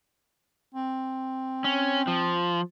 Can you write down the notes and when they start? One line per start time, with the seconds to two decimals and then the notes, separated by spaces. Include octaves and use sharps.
0.75 C4
1.64 C#4
2.07 F3